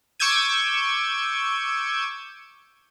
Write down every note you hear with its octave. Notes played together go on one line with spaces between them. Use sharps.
C#6 D6 E6 G6 G#6 D#7